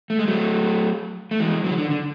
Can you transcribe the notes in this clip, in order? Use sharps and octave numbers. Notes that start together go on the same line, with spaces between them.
A3
G#3
F#3 A3
A3
E3 G#3
D3 F#3
E3
D3
D3